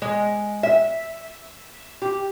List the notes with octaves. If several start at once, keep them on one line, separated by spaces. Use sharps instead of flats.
G#3
E5
G4